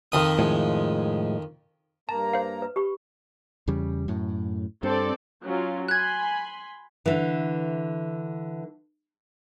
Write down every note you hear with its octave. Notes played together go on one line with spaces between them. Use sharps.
F2 D#3 D#6
A2 F3 G#3
G2 A#3 A5 A#5
C5 F5
B4
G4 B5 C#6
E2 C#3 G3
F#2 A2
G2 C4 A4 D5
F#3 C#4 F4
G#5 B5 C6 F#6 G#6
D3 E3